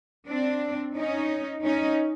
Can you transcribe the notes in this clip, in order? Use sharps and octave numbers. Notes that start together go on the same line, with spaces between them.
C4 D4
C#4 D#4
C#4 D#4